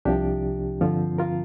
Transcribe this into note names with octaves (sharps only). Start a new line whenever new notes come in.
C2 C3 F3 D4 G4
G2 D3 F3 C4 F4
F4 A#4